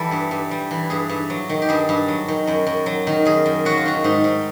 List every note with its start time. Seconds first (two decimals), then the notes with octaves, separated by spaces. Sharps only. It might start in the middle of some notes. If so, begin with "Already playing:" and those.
Already playing: E3 G3 A4
0.11 G2
0.31 G2
0.51 G3
0.71 E3
0.90 G2 G#4
1.09 G2
1.30 F#3
1.49 D#3
1.62 G4
1.69 G2 G#4
1.89 G2
2.08 F#3
2.28 D#3
2.47 F#2
2.66 F#2
2.86 F#3
3.07 D#3
3.25 F#2 G#4
3.46 F#2
3.65 F#3 F#4
3.77 F4
3.85 D#3 F#4
4.04 G#2 D#4
4.24 G#2